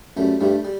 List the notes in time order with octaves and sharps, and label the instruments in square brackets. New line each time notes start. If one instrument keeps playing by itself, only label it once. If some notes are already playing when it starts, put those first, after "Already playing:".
[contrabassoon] F#2 [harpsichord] G3 A3
[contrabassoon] G2 [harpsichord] G3 A3
[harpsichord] G3